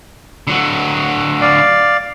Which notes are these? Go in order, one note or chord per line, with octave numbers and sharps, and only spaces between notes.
D3 F#3
D5 F5